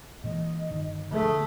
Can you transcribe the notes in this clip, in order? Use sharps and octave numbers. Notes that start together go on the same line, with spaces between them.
A#2 E3 G#3 D#5
G1 D#3
D3 D#3 F3 A3 G#4